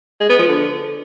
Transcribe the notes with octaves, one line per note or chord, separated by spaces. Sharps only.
G#3
B3
F3
D3